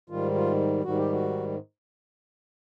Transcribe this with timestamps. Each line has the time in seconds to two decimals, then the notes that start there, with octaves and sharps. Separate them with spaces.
0.10 G#2 D#3 G3 F4
0.35 F4
0.84 G#2 D#3 G3 F#4
0.98 G4
1.12 F#4